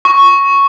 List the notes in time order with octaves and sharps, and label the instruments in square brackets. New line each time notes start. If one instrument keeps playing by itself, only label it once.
[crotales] C#6